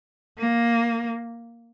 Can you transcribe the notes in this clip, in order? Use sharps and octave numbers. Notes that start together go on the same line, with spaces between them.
A#3